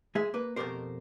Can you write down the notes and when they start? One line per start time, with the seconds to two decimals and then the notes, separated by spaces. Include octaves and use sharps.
0.15 G#3 G#4 E5
0.34 A#3 B4
0.56 F2 B2 A3 G4 A#4 C5